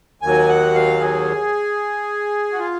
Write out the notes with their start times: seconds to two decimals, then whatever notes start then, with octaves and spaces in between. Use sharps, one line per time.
0.22 D#2 D#3 F#3 G#5
0.49 F#5
0.75 F5
1.00 G#4
2.53 F#4
2.59 F4